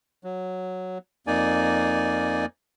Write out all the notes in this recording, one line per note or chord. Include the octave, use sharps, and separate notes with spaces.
F#3
F2 A#3 D#4 D5 G#5